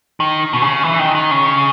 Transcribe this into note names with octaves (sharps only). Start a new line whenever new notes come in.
D#3
B2
C#3
E3
D#3
D#3
C#3